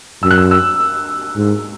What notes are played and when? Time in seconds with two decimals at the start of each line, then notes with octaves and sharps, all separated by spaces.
0.23 F#2 E6
0.31 F#6
0.38 E6
0.51 E6
1.36 G#2